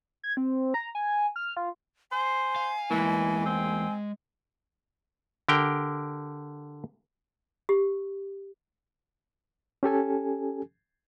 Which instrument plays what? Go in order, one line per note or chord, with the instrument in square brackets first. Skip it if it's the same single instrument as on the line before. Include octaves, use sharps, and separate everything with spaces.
[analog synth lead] G#6
C4
A#5
G#5
F6
F4
[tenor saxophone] C5 [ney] G#5
[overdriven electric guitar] F5
[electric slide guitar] E2 A#3 [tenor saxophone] E3 [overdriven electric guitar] G#3
[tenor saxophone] C4
[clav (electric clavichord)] D3 G4 A#4 G5
[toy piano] G4
[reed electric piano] C#4 G4 A4 G#5